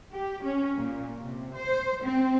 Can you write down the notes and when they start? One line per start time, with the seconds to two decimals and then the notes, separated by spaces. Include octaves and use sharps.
0.13 G4
0.44 C#4
0.77 A#2
1.21 C3
1.55 C5
2.04 C4